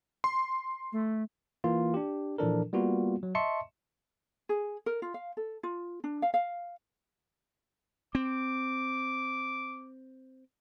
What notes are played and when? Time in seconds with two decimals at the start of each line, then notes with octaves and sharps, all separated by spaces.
0.24 C6
0.92 A3
1.64 E3 A#3 F4
1.94 D4 G4
2.38 A#2 E3 F3 D4 A4 A#4
2.73 G3 A#3 B3 F4 F#4
3.23 F#3
3.35 D#5 E5 A5 C6 C#6 C#7
4.49 G#4
4.86 A#4
5.02 F4
5.14 F5
5.37 A4
5.63 F4
6.04 D4
6.22 F5
6.34 F5
8.15 C4 D6